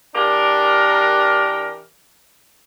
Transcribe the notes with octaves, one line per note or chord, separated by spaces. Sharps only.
E3 D4 G4 A#4